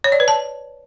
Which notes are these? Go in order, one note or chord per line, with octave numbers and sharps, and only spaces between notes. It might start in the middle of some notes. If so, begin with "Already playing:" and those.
C#5
D5
B4
A5